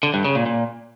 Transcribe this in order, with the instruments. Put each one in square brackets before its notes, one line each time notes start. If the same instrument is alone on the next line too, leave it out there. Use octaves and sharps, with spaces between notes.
[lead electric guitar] D3
G2
C#3
A#2
A#2